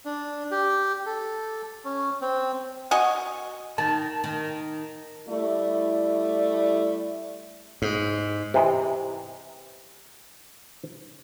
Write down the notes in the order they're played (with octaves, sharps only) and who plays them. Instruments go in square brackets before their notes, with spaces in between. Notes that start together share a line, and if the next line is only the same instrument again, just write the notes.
[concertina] D4
G4
A4
C#4
C4
[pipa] F#4 D#5 G#5 C#6
[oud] D#3 [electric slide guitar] A5
[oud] D#3
[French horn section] G3 A3 E4 D5
[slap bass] G#2
[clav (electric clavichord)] C3 E3 D#5